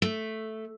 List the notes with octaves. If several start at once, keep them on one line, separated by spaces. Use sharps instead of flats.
A3